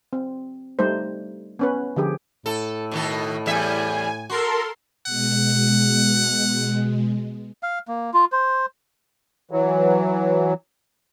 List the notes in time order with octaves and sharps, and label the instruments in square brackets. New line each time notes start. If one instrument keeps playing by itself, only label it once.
[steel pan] C4
G3 A3 D#4 C5
B3 C#4 B4
D3 F3 G4 G#4
[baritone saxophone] A2 [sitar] A4
[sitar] B2 D#3 A4
[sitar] E2 G3 E5 [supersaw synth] G#5
[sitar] F#4 [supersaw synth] A4 A#4 C6
[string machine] B2 G#3 [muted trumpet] F#5
[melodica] F5
A#3
F4
C5
[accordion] E3 F#3